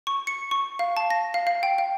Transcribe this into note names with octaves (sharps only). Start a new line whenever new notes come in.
C#6
C#7
C#6
F5
A5
A#6
F5
F5
G5
F5